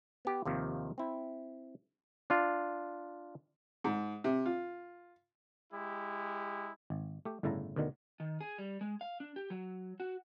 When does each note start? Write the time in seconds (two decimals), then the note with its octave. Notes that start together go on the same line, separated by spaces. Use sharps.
0.25 B3 G4
0.45 D#2 C3 D#3 F3
0.98 C4 E4
2.30 D4 F4
3.84 G#2
4.24 C3
4.46 F4
5.73 G#3 E4 G4
6.90 G#1
7.25 A3 G4
7.43 G1 A2 C#3 E4 A5 A#5
7.76 D2 B2 D3 D#3
8.20 D#3
8.41 G#4
8.58 G3
8.81 G#3
9.01 F5
9.20 D4
9.36 G4
9.50 F#3
10.00 F#4